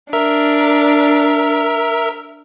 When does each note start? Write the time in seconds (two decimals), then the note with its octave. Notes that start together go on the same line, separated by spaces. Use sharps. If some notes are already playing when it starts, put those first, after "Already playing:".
0.13 D4 A#4 E5